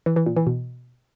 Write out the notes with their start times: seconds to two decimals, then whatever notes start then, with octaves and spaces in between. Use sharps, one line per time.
0.06 E3
0.16 E3
0.26 A#2
0.36 E3
0.47 B2